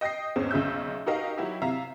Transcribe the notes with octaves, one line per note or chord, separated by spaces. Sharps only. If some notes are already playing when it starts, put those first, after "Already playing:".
D#5 G5 D#6 A#6 C7
E2 G#2 G#3 C4 C#4
B1 C#3 E5 E6 G6
D#4 F#4 G4 A#4 D#5 F5
F#3 E4 F#4 G4
C3 E5 F5 A#5